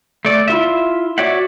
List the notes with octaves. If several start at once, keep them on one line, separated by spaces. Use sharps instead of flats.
A3 D5
E4 F4 E5
F#4 C#5 D5 E5 F#5